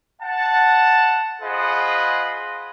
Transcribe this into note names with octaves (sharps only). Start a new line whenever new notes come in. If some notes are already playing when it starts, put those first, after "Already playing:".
F#5 A5
F4 G#4 C5 D#5 F#5 B5